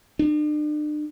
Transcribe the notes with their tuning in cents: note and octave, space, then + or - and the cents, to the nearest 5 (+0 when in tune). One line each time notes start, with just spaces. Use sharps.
D4 +40